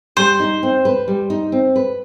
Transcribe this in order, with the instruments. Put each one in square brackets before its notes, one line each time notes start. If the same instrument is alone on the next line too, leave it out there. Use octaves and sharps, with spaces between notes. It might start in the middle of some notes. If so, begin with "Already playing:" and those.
[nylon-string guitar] G3 [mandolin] C5
[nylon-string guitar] D#4
C4
B4
G3
D#4
C4
B4